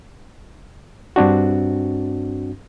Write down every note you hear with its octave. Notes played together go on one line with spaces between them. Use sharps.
G2 C4 D4 F#4